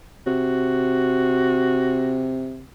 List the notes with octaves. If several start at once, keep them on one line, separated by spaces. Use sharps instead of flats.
C3 F#4